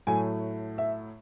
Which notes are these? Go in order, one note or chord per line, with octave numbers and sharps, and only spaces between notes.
A2 F#3 A3 G#5
E5